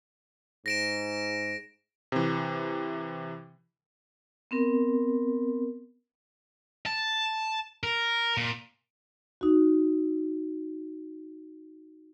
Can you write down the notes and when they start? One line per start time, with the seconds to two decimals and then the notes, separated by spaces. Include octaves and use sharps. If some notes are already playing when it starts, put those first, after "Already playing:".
0.66 G#2 A#6 D7 E7
2.12 C3 E3
4.51 B3 C4 A#4
6.86 A5
7.83 A#4
8.37 A#2
9.41 D#4 F#4